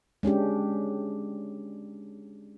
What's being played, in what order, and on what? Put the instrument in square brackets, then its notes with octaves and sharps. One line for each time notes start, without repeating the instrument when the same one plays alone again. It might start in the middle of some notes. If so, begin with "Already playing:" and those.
[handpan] G#3 C#4 D4 G4